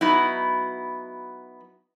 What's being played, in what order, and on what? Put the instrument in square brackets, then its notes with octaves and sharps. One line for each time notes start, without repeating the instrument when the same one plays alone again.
[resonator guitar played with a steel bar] F#3 B3 D#4 E4